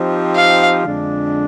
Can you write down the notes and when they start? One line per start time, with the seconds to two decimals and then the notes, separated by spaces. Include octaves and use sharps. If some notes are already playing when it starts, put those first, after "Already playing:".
Already playing: F3 C4 D#4 G4 C5
0.35 F5
0.85 F2 D3 G#3 D4